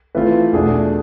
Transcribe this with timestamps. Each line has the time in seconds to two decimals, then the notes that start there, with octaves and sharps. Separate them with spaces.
0.15 E3 A3 C4 F4 B4
0.53 E2 B2 A3 D4 G#4